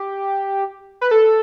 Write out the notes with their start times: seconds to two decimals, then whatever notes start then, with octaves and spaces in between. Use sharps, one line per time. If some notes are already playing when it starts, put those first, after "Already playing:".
Already playing: G4
1.01 B4
1.11 A4